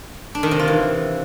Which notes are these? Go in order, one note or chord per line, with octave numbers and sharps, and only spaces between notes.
D4
D#3
C3
F4
E3